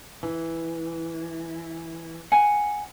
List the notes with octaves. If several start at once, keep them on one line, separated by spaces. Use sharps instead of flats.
E3
F#5 G#5